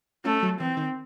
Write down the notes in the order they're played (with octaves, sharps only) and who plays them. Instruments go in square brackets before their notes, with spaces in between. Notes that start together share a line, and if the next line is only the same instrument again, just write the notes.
[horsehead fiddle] A3 [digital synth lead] C#4
[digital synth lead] F#3
[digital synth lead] E3 [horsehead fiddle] C4
[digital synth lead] D#3